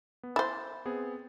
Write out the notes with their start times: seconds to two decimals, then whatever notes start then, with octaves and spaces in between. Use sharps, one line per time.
0.23 B3
0.36 E4 C5 A6
0.85 B3 C4 G#4